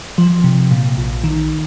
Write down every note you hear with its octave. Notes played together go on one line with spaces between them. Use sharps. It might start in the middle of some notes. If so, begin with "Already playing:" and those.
F3
C3
A#2
A#1
D#3